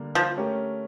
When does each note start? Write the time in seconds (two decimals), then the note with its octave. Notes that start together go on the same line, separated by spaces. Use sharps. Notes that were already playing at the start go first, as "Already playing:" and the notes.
Already playing: D3 G3 A#3 D4
0.15 F3
0.37 A3 C#4 G4 A#4